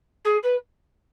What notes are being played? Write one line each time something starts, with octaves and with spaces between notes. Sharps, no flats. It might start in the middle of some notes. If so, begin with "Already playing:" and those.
G#4
B4